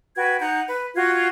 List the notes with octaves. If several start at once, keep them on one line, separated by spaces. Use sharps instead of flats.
F#4 B4 G5 G#6
D#4 F#5 A#5 G6
B4
F4 F#4 F#6 G#6